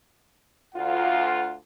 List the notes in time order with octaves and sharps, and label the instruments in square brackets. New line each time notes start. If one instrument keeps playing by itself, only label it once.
[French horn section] D2 F4 [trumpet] F#5